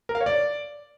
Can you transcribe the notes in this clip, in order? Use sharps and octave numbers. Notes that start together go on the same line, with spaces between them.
A#4
F5
C#5
D5